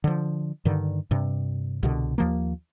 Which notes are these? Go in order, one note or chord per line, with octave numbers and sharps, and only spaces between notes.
D3 F3
G2 D3 D#3
G2 C3
C2 B2 D3
D#2 F3 A#3